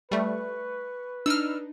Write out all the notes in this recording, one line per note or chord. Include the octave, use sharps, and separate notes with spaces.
G3 A3 B4 C#6
D4 D#4 E6 F6